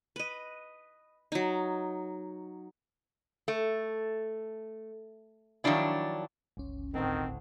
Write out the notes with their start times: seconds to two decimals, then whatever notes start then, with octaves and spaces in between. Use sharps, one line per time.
0.16 B4 D#5
1.32 F#3 D#4
3.48 A3
5.64 D#3 F3 F#3 D4 E4
6.57 G1 C#2 C#4
6.94 D2 A2 D#3 C4